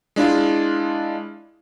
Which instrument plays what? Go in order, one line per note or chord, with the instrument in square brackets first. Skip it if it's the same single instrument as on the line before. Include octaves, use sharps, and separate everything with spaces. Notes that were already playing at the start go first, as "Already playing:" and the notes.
[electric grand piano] G#3 D4 E4 F4